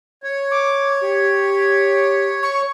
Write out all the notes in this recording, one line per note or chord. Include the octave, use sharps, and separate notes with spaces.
C#5
D6
G4
C#6